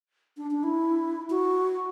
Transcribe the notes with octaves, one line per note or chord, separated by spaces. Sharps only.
D4
D4
E4
F#4